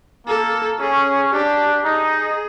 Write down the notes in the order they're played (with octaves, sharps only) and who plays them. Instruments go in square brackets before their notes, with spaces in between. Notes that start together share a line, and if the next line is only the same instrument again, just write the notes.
[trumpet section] A#3 [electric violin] A4
[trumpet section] C#4 [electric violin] G#4
[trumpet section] D4 [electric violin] G4
[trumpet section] D#4 [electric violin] G#4